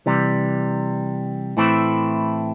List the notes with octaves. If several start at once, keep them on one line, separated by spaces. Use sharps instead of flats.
C3 E3 G3
A2 E3 A3 C4 E4